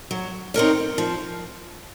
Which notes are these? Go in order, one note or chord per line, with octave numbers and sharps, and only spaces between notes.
F#3
C4 D#4 A#4 C#5
F3